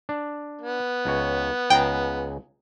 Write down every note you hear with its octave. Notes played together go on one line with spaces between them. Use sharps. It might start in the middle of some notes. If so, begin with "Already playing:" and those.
D4
B3
C#2 C#5
C#2 G#4 G5 A#5